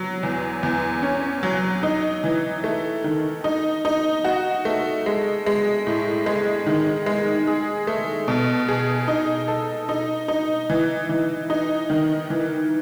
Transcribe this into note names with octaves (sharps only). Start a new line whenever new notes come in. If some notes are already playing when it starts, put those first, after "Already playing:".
Already playing: F#3
E2
E2
C#4
F#3
D#4
E3
A3
D#3
D#4
D#4
F#4
A3
G#3
G#3
A2
G#3
D#3
G#3
G#4
A3
B2
G#4
D#4
A4
D#4
D#4
E3
E3
D#4
D#3
E3